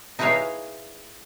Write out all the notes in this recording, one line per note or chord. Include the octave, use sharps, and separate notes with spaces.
D#4 E4 G#4 B4 C#5 F5